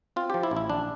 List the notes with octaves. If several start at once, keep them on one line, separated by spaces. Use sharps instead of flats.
C4 F4
F3 G4
E4
A1
E4
A#1 D4